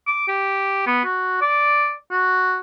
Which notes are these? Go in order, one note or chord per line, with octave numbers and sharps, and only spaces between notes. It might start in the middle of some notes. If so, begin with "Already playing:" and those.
D6
G4
B3
F#4
D5
F#4